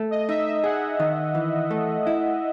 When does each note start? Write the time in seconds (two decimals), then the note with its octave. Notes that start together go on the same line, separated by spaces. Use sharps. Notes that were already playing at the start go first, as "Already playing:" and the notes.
Already playing: A3
0.10 D#5
0.29 D#4 E5
0.46 E5
0.64 G#4 F#5
1.00 D#3
1.35 E3
1.71 A3
2.07 E4